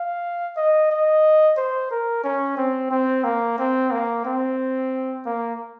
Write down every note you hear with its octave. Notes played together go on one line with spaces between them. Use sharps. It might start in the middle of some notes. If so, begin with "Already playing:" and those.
Already playing: F5
D#5
D#5
C5
A#4
C#4
C4
C4
A#3
C4
A#3
C4
A#3